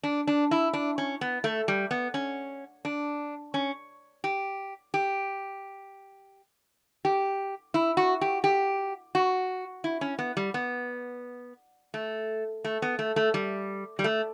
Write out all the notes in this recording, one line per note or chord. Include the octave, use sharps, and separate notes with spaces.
D4
D4
E4
D4
C#4
B3
A3
G3
B3
C#4
D4
C#4
G4
G4
G4
E4
F#4
G4
G4
F#4
E4
C#4
B3
G3
B3
A3
A3
B3
A3
A3
G3
G3
A3